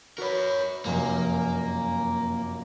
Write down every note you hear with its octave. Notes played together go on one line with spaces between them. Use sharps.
F#4 A#4 B4 C#5 B5
F1 F#2 A#3